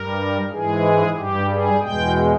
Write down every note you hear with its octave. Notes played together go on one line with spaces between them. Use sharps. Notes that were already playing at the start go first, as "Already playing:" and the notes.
Already playing: G2 G3 A#4
G#2 E3 G#3 G#4
G2 G3 G4
G#4
E2 B2 G#3 G5